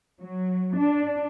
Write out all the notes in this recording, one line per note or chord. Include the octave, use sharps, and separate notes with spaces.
F#3
D4